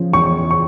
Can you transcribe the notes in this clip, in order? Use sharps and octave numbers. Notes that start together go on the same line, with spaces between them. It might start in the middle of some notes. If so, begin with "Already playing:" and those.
Already playing: C#3 F3
E2 C#6
C#6